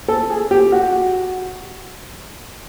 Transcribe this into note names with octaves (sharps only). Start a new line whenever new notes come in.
A4
G#4
G4
F#4